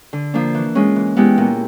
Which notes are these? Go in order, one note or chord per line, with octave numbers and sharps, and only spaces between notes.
D3
F3 A#3 D4
E3
G#3 C#4 F4
E3
G#3 B3 E4 G4
A#2